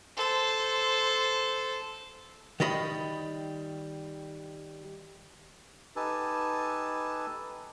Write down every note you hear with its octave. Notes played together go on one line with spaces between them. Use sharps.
A4 C5
D#3 G3 D#5 B5
D#4 G4 A4 B4 G#5 A5